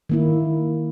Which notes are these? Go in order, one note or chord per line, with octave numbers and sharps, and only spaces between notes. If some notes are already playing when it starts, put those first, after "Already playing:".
D#3 A#3 E4